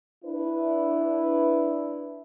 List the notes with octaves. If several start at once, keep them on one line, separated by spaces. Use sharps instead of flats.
D4 E4 B4